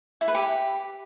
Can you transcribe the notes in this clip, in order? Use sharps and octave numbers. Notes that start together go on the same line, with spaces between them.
E4
B4
G4